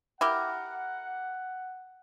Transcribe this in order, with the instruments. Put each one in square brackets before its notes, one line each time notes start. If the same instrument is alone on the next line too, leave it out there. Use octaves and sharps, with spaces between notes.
[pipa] E4 G4 A#4 [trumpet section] F#5